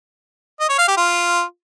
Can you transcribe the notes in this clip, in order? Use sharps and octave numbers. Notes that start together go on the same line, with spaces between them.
D#5
C#5
F5
G4
F4